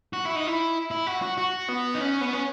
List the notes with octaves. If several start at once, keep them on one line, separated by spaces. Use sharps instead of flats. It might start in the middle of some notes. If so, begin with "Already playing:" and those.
F#4
E4
D#4
E4
E4
F#4
F#4
F#4
B3
D#4
C#4
B3
C#4